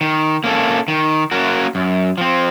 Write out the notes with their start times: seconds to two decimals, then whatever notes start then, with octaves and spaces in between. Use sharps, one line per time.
0.01 D#3
0.44 A#3 C#4 A4
0.88 D#3
1.31 A#3 C#4 F#4 A#4
1.75 F#2
2.18 F3 C4